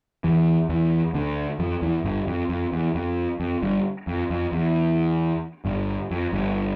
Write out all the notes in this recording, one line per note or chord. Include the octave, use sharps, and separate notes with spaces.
E2 E3
E2 E3
D2 D3
F2 F3
E2 E3
G1 G2
F2
F2
E2
F2
F2
G1 G2
F2
F2
E2
G1 G2
F2
G1 G2